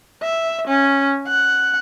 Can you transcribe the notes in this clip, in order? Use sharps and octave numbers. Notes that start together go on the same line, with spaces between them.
E5
C#4
F#5